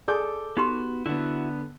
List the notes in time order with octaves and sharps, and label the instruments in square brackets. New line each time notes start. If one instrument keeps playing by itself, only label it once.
[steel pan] G#4 D5 [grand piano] A4 D6 G6
[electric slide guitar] B3 F#4 [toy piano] D#4 G4 C6
[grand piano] D3 B3 [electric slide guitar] E4 F#4